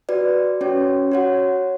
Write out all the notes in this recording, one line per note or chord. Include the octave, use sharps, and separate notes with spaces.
F#4 B4 D5
C#4 F#4 C#5
F#4 C#5 F#5